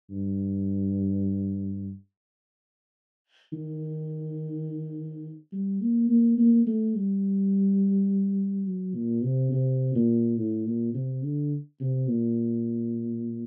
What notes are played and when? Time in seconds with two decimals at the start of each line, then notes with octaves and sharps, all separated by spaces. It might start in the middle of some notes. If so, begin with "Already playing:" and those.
0.10 G2
3.53 D#3
5.52 G3
5.81 A#3
6.09 A#3
6.38 A#3
6.67 A3
6.95 G3
8.66 F#3
8.95 A#2
9.23 C3
9.52 C3
9.95 A#2
10.37 A2
10.66 A#2
10.94 C3
11.23 D3
11.80 C3
12.08 A#2